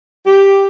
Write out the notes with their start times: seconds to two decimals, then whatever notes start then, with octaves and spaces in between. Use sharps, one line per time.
0.26 G4